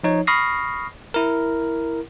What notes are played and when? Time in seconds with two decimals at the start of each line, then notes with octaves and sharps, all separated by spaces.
0.04 F3 D#4 C#5
0.27 B5 C#6 D#6 F6 A#6 C7
1.14 E4 A#4